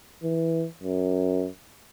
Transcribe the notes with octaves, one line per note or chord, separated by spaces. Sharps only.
E3
F#2